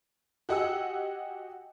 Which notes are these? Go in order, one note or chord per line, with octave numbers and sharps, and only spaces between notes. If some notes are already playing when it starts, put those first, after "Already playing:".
F#4 G4 D#5 F#5 G#5 E6